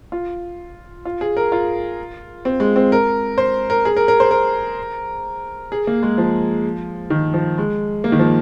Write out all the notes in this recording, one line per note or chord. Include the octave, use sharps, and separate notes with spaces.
F4
F4
G#4
A#4
F4
C4
G#3
C4
A#4
C5
A#4
G#4
A#4
A#4
C5
A#4
G#4
A#3
G#3
F3
D#3
F3
G#3
A#3
D#3
F3